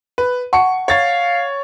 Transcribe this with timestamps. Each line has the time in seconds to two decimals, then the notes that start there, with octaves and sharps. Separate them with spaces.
0.18 B4
0.53 F#5 A5 C#6 C#7
0.88 C#5 F5 A6